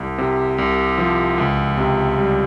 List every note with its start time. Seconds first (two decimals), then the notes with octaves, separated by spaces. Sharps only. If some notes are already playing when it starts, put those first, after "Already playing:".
Already playing: C2
0.18 C3
0.58 C2
0.98 F3
1.38 C#2
1.77 C3
2.18 G3